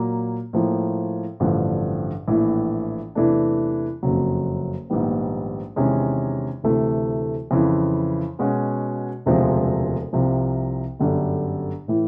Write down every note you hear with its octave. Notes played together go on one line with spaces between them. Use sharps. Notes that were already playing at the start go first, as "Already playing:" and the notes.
Already playing: A#2 F#3 A#3
A2 F3 A#3
A1 G2 D3 F3
A#1 A2 E3
E2 C3 E3 A3 D4
F#1 F2 C#3 F#3
A#1 G#2 D#3 G3 B3
E2 C3 D#3 G#3 C#4
D2 C3 E3 A3
F2 C#3 E3
B2 G#3 C#4 F#4
E1 D2 C3 F3 G#3
C2 C3 F3
G1 F#2 D3 G3
A2 E3